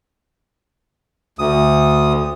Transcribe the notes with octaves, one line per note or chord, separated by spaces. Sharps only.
D2 D#6